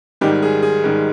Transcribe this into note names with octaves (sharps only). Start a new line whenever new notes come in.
G#2 D#3 G3 G4
G#4
G#4
G#2 D#3 G3